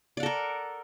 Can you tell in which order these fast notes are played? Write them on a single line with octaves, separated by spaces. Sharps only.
D5 F#5 A4 A#4